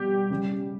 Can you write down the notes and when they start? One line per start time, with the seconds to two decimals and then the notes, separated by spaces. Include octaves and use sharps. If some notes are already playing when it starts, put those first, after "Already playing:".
Already playing: B2 G3 G4
0.30 C#3 G3